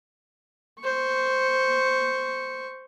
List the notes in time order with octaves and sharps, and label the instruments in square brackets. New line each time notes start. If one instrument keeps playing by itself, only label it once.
[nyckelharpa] C5 C#6